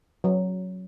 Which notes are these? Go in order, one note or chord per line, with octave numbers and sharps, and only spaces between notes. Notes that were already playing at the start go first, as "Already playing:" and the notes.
F#3